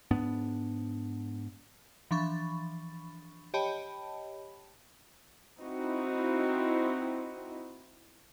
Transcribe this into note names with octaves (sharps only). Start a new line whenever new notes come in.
G#2 B3 D4
E3 F3 D4 B5 C#6 A6
G4 C#5 D#5 G5 A5 B5
C4 D#4 E4 F#4